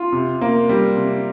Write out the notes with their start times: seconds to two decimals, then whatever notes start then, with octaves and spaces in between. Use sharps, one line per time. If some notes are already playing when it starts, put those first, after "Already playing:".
Already playing: F4
0.12 C3
0.41 A#3
0.69 G3
0.96 C3